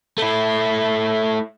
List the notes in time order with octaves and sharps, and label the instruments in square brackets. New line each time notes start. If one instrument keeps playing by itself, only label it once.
[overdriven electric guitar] A3 E4